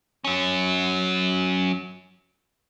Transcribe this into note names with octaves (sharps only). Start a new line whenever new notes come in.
F#3 C#4